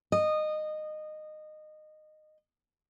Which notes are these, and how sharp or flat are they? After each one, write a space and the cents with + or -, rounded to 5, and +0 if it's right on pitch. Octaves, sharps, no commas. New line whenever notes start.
D#5 -20